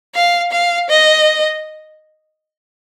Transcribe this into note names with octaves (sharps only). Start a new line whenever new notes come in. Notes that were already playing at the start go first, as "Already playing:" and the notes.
F5
F5
D#5